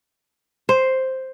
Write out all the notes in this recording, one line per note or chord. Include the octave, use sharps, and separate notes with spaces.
C5